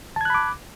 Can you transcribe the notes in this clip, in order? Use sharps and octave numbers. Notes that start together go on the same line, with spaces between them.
A5 B5 D6 F#6 G#6